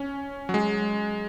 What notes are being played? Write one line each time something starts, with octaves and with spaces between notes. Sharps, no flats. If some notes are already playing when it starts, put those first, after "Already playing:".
Already playing: C#4
F#3
G#3